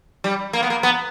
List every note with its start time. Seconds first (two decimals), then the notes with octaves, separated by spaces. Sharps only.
0.24 G3
0.53 A#3
0.63 B3
0.70 A#3
0.83 B3